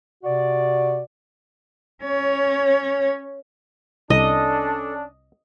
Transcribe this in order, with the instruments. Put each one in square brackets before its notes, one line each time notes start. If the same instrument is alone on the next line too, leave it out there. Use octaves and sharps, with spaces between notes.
[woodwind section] C3 F#4 D5
[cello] C#4 C#5
[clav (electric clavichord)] C2 [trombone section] C#4 D4 [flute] A4 [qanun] D#5